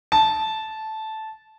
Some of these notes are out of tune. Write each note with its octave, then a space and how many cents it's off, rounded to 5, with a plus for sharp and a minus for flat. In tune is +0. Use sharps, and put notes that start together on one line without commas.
A5 -10